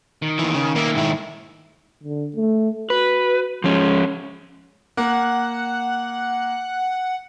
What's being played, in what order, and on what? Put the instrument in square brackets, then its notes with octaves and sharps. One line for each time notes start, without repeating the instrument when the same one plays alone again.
[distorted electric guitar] D#3
[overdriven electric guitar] D#2 E3
C#3
[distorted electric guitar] D#3 E5 [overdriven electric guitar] A#3
[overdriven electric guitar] G#2 E4
[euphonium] D3
A3
[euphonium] F#4 [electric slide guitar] B4
[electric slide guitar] F3 C#4 [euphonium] G#3
[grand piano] A#3 [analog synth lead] F#5